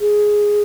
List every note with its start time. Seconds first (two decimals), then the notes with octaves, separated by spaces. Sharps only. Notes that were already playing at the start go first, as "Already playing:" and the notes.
0.01 G#4